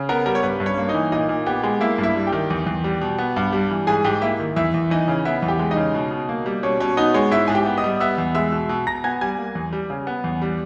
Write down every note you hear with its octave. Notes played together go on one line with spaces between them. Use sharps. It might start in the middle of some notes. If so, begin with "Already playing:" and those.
Already playing: C#3
B3 A#4
G3 A#4
C#5
G2 B4
G2
C#4 C#5
A#3
D#4 D#5
E3
A#2 D#4 D#5
A#2
B3 G4 G5
G#3
A#3 E4 E5
G2
E4 E5
G3
G4 G5
D#3
E2
E2
G3
B2
B3
G2
G3
E3
G#2 G#4 G#5
G#2 G4 G5
A#3 E4 E5
D#3
E2 E4 E5
E2
E3 D#4 D#5
C#3
B3 E4 E5
E2
G4 G5
G#3
D#4 D#5
C#3
B2
B2
A#3
G3
B2 C#4 C#5
B2 C#4 C#5
B3 D#4 D#5
G#3 C#5 C#6
G#2 E4 E5
G#2 G#5
G4 G5
B3
D#5 D#6
G3
B3 E5 E6
E2
G#3 E5 E6
B2
B2
B2 A#5 A#6
B3 G#5 G#6
G3 G#5 G#6
A#3
E2
G3
C#3
B3
E2
G3